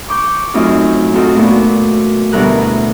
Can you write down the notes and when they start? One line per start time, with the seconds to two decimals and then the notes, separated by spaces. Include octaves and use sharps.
0.08 C#6 D6 G6
0.54 F#2 A2 C4 D#4 F4
1.13 C4 D#4 F4 F#4 A4
1.35 A#2 A3 B3 D4 F#4
2.33 D2 B2 G3 E4 A#4 F#6